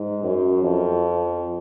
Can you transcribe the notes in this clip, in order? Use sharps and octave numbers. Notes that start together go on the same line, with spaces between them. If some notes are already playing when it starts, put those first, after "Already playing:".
Already playing: G#2
F#2
F2